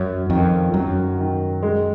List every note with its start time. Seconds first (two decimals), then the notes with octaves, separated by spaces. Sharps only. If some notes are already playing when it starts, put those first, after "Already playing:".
Already playing: F#2 C#4
0.30 F2 D#3
0.74 F#2 F#3
1.19 D#3
1.63 G#3